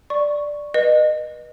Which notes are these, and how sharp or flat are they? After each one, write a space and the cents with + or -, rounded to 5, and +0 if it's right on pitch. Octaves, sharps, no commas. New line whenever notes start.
D5 +0 C#6 +0
B4 -30 D#5 -25